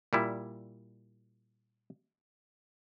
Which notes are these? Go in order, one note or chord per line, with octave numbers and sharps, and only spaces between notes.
A#2 G3 E4